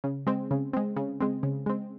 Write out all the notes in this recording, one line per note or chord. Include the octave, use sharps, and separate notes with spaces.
C#3
G#3 C4
C#3
G#3 C4
C#3
G#3 C4
C#3
G#3 C4